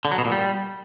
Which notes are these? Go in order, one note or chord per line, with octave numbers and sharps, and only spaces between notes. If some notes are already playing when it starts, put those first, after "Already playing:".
D3
F#3
B2
A#2
G3